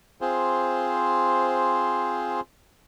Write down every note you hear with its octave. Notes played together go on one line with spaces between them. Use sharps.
C4 F4 G#4 C5